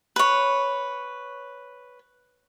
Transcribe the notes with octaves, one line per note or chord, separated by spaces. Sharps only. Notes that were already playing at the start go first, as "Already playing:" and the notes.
B4 C#5